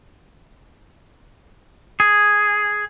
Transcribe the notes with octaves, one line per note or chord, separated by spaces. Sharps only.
G#4